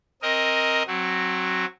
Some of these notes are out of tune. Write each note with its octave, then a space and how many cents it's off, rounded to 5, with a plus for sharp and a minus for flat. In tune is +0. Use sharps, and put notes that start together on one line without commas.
C4 +25 A#4 +0 D#5 +10
F#3 +0 C4 +20 F#4 +0